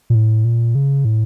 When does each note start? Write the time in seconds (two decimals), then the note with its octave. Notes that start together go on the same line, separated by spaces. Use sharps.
0.10 A#2
0.15 A2
0.45 A#2
0.75 C#3
1.05 A2